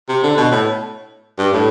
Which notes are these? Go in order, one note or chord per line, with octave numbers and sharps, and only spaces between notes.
C3
D3
B2
A2
G2
A2